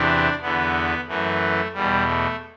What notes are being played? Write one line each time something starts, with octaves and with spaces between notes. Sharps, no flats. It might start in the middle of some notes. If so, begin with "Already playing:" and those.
Already playing: E2 C3 E3 D4
E2 D3 B3
F#2 E3 A3
E2 B2 G3
A3